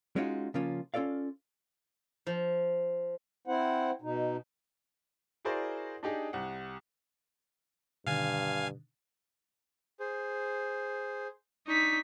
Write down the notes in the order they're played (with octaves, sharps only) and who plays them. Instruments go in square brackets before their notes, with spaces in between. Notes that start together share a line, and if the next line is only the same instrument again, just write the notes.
[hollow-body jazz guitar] G#3 C#4 D#4 F4 F#4
C#3 F3 A#3 C#4 F4
C#4 F4 A4 D5 F5
[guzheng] F3
[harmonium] C4 E4 C5 F#5
B2 D#4
[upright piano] E4 F#4 G#4 A#4 C5 D5
D4 D#4 G4 G#4
C2 F#5
[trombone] G2 [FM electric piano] B2 D3 D#3 [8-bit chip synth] F5 G#5
[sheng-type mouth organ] G#4 C5
[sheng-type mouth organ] D4 C#6 [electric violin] D#4 B6